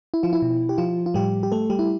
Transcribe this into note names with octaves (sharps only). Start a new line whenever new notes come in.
E4
F3 F4
E4
B2
G4
F3 F4
F4
A2 F3 G3 G4
G4
A3 A4
G3 G4
E4